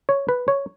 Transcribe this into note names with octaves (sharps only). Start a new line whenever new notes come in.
C#5
B4
C#5